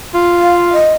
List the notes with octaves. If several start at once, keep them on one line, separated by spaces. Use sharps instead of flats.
F4
F5
D#5